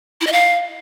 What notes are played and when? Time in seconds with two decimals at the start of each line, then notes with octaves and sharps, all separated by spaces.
0.21 E4
0.27 D#5
0.32 F5